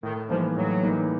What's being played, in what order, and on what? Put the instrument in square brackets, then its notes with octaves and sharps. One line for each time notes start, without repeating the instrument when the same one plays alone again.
[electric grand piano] A2 [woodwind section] D#3
[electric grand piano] E3 G3 A#3 D#4 [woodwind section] F3
[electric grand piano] A2 [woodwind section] F#3
[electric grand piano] E3 G3 A#3 D#4